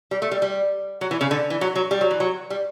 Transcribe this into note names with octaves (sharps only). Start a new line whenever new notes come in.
G3
A3
G3
G3
F#3
E3
C#3
D3
E3
F#3
F#3
G3
F#3
E3
F#3
G3